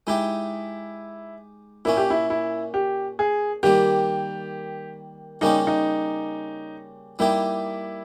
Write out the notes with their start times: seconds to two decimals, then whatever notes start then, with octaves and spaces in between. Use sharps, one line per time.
0.07 G#3 D#4 E4 G4
1.85 A#2 A#3 C#4 E4
1.97 G4
2.10 E4
2.30 E4
2.74 G4
3.19 G#4
3.63 D#3 G3 A#3 G4
5.41 C#3 G3 A#3 C#4 D#4 G4
5.67 D#4
7.19 G3 A#3 D#4 E4 G4